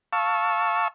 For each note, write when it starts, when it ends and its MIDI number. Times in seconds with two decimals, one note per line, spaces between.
0.13 0.88 77
0.13 0.88 81
0.13 0.88 85
0.13 0.88 88